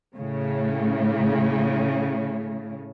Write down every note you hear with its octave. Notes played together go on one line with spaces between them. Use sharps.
A2 C#3